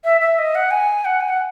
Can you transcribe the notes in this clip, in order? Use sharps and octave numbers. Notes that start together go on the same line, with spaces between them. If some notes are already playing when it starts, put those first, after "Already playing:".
E5
E5
D#5
F#5
G#5
F#5
G#5
F#5